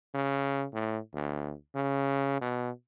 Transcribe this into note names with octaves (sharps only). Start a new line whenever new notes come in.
C#3
A2
D2
C#3
B2